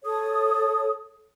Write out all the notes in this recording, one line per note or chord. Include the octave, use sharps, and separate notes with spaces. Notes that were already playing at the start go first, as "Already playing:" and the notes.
A4 C#5 D#6